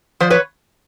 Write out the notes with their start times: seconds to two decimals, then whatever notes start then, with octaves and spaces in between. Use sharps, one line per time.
0.20 F3 C5 D5
0.30 B4 C#5